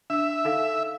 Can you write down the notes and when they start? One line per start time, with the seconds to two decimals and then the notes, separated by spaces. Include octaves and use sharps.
0.10 D4 E5 E6
0.45 D#4 A4 F5